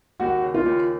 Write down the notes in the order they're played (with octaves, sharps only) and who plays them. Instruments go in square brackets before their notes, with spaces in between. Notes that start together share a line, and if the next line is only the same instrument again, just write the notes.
[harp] D#2 [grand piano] F#4
[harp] C#3
[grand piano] F4
[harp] D#2